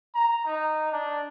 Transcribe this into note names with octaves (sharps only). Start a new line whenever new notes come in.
A#5
D#4
D4